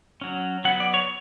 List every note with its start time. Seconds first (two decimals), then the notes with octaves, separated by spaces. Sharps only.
0.21 F#3 C#4
0.65 F#3 B3 F#5
0.80 D5
0.94 C#5